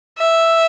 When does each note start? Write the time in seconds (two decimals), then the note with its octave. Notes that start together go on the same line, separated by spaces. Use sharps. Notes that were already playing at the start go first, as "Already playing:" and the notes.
0.18 E5